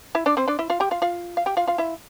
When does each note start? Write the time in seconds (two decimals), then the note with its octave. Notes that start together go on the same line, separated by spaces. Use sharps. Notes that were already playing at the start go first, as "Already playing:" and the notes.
0.15 E4 E5
0.26 D4 D5
0.37 C4 C5
0.48 D4 D5
0.59 E4 E5
0.70 F4 F5
0.80 G4 G5
0.91 F4 F5
1.02 F4 F5
1.37 F5
1.46 G4 G5
1.57 F4 F5
1.67 F4 F5
1.78 E4 E5